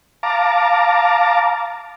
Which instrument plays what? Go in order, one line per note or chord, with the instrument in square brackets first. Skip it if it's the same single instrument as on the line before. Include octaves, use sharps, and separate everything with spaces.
[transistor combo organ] F5 A5 A#5 D6